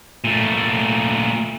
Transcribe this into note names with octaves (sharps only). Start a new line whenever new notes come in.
A#2 A3